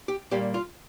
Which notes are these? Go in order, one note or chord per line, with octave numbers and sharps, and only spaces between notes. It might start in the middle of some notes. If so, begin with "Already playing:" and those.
G4
A#2 G3 A#3 G4
F4